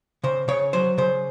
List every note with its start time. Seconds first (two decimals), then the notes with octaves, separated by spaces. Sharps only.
0.23 C#3 C5
0.48 C#3 C#5
0.73 F#3 C5
0.98 C#3 C5